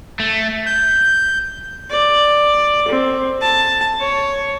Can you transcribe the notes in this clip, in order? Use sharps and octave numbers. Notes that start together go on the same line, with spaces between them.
A3
G6
D5
C4
A5
C#5